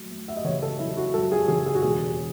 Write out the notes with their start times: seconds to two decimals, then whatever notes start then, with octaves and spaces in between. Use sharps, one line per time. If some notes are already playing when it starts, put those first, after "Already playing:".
Already playing: F#3 A3
0.11 A3
0.28 E5
0.37 D#5
0.44 C#3 C#5
0.62 A4
0.79 F#3 E4
0.97 F#4
1.14 F#2 A4
1.32 G#4
1.48 C#3 G#4
1.66 G#4
1.75 F#4
1.82 E1 G#4